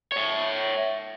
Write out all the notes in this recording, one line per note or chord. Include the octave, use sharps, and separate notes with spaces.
C#5 E5